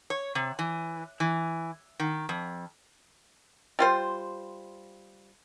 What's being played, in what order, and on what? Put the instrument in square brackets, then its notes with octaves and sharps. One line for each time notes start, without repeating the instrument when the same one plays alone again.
[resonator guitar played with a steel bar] C#5
C3
E3
E3
D#3
F2
[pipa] G3 F4 C5